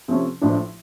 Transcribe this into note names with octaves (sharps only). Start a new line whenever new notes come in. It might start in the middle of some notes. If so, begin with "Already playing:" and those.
C3 F3 A3 C#4
A1 A2 F3 A3 D4